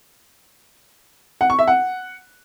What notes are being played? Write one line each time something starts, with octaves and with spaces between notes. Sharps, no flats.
F#5
C#6
E5
F#5